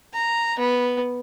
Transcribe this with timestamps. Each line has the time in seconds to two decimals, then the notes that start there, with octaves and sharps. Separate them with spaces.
0.13 A#5
0.59 B3